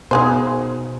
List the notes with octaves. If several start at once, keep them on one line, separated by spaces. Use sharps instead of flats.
B2 D#4 G#4 C5